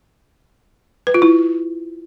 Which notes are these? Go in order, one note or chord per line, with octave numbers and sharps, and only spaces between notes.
B4
F4
E4